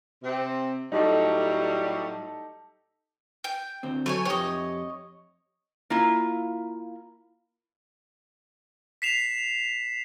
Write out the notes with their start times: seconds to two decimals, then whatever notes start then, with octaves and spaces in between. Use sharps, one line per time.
0.23 C3 C4
0.92 A2 F#3 G3 D#4 G4 A4
3.44 G5
3.83 D2 C4
4.06 F#3 A3 C#5 G#5
4.25 F2 G4 C#5 D#5
5.90 A#3 E4 F4
9.02 B6 C7 E7 F7